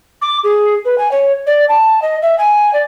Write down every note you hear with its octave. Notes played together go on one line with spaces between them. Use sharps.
D6
G#4
B4
G#5
C#5
D5
A5
D#5
E5
G#5
D5